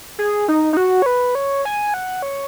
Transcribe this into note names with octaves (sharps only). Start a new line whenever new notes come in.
G#4
D#4
D#4
F#4
C#5
B4
C#5
G#5
F#5
C#5